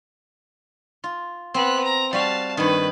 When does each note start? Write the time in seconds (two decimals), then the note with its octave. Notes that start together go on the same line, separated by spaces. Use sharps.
1.04 F4
1.54 B3 C4 F#6
1.84 A#5
2.13 G3 F#4 F5 A5
2.57 G2 D#3 B4